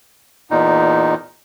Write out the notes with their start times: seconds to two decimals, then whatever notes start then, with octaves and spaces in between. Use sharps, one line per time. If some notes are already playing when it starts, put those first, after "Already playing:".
0.51 E2 A#2 D#4